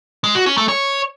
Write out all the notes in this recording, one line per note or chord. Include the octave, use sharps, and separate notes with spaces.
G#3
F#4
C#4
A3
C#5